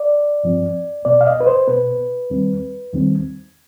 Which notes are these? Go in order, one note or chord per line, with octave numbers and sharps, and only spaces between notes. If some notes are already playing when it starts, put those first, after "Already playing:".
Already playing: D5
G2 F3 C4
B2 B3 D5
F5
D#5
B4
C5
B2 B3 B4
D#2 D#3 G3 C4
D#2 D#3 G3 C4